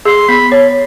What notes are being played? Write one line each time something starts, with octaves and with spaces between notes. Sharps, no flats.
G#4 C6
B3 B5
C#5